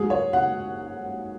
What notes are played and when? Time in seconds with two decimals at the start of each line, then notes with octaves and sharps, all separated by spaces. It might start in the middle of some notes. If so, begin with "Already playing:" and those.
Already playing: G#2 F#3 G#4
0.10 C#5
0.33 F#5